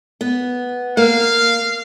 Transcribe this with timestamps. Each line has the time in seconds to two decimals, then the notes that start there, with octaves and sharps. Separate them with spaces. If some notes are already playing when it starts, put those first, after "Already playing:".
0.21 B3
0.97 A#3 F5